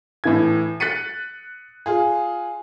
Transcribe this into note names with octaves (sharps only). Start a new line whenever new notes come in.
A2 E3 G#6
F#6 A6 B6 C#7 D#7
F4 G#4